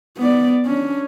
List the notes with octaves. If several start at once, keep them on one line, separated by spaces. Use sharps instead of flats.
B3 D5
C#4 D4